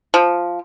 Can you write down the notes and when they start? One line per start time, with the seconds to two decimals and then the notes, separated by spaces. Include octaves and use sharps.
0.14 F3